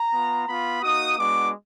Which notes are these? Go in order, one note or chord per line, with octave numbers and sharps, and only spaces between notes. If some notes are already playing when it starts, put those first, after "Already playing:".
Already playing: A#5
B3 F4
B3 F4 B5
A#3 D#4 F#4 D#6
G#3 B3 D4 F#4 D6